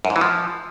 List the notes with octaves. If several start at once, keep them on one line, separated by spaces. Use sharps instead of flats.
F#2
G#2
E3
F3